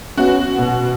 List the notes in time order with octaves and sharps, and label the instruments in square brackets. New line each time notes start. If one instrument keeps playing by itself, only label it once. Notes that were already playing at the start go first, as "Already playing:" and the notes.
[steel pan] B3 C#4 [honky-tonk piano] F#4
[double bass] B2